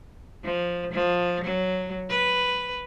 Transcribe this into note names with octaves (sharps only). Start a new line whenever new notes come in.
F3
F3
F#3
B4